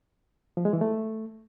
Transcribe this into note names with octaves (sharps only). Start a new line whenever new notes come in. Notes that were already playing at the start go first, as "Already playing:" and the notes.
F3
G#3
E3
A3